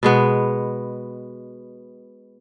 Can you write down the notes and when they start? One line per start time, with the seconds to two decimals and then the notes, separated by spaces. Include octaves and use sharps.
0.03 B2 G#3 B3